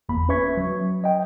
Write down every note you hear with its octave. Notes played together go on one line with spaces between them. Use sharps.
G1 E2 A#3 B5
C#4 B4 E5 C#6 G#6 B6
F#3
D#5 G5